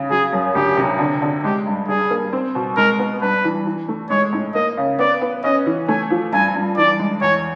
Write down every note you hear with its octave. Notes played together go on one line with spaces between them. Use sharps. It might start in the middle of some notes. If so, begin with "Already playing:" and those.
Already playing: C#3
F#3 G#4
F#2
D2 G4
C3
D3
D3
G#3 G4
G2
G3 G#4
A#3
C4
B2
G#3 A#4
B3
G2 B4
E3
E3
A3
G#3 C#5
A2
A#3 D#5
C#3
B3 D5
B3
C#4 D#5
E3
A3 G#5
F3
G2 G#5
G2
E3 D5
G#3
E2 C#5